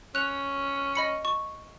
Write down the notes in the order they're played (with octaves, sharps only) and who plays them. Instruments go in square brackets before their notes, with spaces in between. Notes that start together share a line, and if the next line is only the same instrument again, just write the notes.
[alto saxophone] C#4 [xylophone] F#6 F7
[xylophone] D#5 B5 C#7
C#6